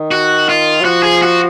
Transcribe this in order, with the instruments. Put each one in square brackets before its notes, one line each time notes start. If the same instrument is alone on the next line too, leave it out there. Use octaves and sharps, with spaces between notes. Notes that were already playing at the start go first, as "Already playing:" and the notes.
Already playing: [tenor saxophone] D#3
[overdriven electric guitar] F#4
F4
[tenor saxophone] F#3
[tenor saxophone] F3 [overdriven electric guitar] F#4
[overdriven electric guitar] G#4
F#4